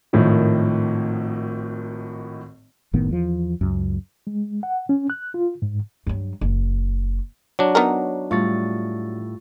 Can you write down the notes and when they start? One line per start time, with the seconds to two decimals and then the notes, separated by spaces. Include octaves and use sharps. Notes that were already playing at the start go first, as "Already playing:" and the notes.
0.13 G#1 A2 D#3 F3
2.93 F#1 A2 D#3 B3
3.09 E2 E3 F3
3.61 C#2 F#2
4.27 G#3
4.63 F#5
4.89 C#4
5.10 F#6
5.34 F4
5.62 G#2
6.07 G2 F#3
6.41 F#1
7.59 F#3 D4 C#5
7.75 B3 D#4 A#4
8.31 A2 G3 F4 C#6 A6